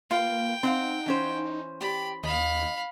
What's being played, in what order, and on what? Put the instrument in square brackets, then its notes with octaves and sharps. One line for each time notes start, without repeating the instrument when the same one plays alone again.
[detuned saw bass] A#3 [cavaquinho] F4 B4 F5 [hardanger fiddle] G5
[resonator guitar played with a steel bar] C4 [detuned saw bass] D#4 [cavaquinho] F5 F#5 C6
[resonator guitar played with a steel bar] E3 C#4 C5
[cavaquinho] G4 D5 [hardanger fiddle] B5
[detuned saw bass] D#2 [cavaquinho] D#5 [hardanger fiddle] F5 B5